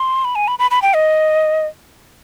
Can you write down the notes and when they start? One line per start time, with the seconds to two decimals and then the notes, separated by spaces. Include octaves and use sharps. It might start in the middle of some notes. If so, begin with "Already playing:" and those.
Already playing: C6
0.24 B5
0.35 G#5
0.48 B5
0.59 B5
0.71 B5
0.82 G5
0.94 D#5